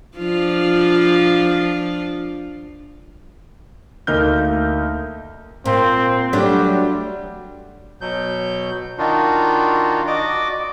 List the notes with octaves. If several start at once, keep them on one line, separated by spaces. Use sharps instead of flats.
F3 D4 F4
D2 A#3 D#4 F6 G6
A#2 C4
F#3 G3 A3 D4
B2 F#3 G6
D#3 D4 D#4 F4 F#4
F#4 D5 D#5 D6